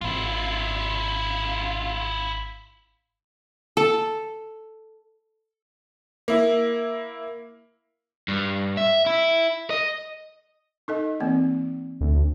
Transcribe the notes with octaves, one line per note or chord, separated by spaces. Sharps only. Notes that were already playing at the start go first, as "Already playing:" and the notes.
G#1 E4 F4
A4
A#3 E4
G2
E5
E4
D#5
D#4 A4 D#5
E3 A#3 C4
D2